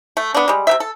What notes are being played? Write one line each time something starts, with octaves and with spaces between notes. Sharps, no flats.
A3
B3 D4
G3 G#3
C3 C4 E5
A4